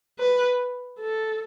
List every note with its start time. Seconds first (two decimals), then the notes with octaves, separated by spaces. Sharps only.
0.19 B4
1.00 A4